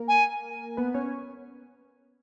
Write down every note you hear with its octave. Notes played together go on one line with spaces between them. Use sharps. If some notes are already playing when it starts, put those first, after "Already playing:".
Already playing: A#3 A#4
G#5
B3 B4
C#4 C#5